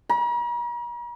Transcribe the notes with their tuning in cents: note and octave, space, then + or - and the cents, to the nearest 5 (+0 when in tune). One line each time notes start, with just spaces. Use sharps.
A#5 +45